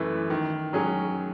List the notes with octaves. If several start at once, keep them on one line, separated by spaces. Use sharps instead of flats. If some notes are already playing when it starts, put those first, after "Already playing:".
Already playing: F#2 E3 A3
D#3
F#3 C#4 G#4